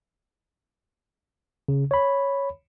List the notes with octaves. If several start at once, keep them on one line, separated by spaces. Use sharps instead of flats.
C#3
C#5 B5